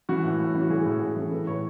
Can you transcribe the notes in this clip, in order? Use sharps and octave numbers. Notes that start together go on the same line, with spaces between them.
E3 F#4
A2
A2
E3
F#4
E3 G#4
A2
A2
E3 A4
E3 B4
A2 C#5